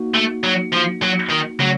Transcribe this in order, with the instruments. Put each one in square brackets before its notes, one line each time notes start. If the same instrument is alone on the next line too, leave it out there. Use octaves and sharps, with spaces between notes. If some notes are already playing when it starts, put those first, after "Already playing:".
Already playing: [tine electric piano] A#3 D#4 F#4
[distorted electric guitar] A3
F#3
F3
F#3
D#3
[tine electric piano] C#3 A3 C#4 [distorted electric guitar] F#3